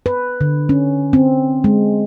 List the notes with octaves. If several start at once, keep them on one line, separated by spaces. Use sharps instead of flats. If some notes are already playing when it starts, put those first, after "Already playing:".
B4
D3
C#4
C4
G#3